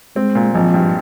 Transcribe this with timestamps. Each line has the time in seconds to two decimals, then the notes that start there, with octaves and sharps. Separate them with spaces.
0.16 G#3 C4
0.35 A#2
0.54 G#1 F3
0.74 G2